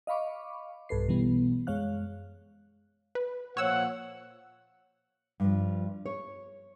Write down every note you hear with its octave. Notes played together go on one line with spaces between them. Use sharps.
D#5 F5 B5 C#6 D6
B1 G2 A4 B4 C7
B2 E3 G3 B3
F#2 G#3 C#5 F5 F#6
B4
A#2 F3 C#5 F#5 E6
G2 F3
C#5